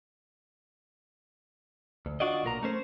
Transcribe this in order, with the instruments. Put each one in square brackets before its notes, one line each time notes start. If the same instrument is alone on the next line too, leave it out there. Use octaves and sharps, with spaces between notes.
[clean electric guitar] D2
D4 F4 F#4 D5 D#5
B1 A#2 A#4 A#5
A3 C#4 C5